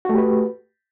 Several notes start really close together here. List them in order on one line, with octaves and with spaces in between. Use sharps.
F#4 A3 G4 B4